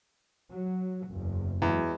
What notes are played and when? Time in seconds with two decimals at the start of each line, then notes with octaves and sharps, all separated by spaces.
0.50 F#3
1.08 F#1 E2
1.62 E2 F#3 G#3